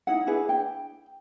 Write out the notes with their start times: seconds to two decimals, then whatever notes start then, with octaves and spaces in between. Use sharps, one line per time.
0.07 D#4 E4 F#5
0.27 D4 E4 G#4 B4
0.49 G5